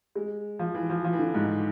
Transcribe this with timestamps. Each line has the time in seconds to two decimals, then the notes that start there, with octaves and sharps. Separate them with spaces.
0.15 G#3
0.59 F3
0.74 E3
0.90 F3
1.04 F3
1.13 E3
1.19 D3
1.34 G#2